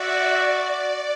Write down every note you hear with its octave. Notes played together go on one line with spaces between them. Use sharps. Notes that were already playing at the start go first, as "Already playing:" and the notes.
Already playing: F#4 D5 E5
D5